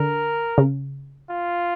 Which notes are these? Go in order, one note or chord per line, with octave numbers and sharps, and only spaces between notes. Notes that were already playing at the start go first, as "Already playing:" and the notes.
Already playing: D3 A#4
C#3
F4